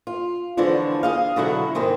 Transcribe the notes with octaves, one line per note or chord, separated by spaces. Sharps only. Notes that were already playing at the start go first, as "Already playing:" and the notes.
F4
D3 E3 F3 G#3 C#4 D4
G#4 D#5 F5
B2 D3 F#3 G#3 E4 F#4
G#2 C3 D#3 G#3 C4